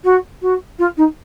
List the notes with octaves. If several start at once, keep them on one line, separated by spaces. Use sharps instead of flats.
F#4
F#4
F4
D#4